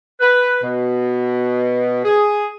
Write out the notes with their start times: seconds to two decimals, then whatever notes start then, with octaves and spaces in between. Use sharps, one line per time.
0.20 B4
0.62 B2
2.04 G#4